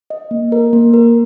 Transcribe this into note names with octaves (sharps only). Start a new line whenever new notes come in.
D#5
A#3
A#4
A#3
A#4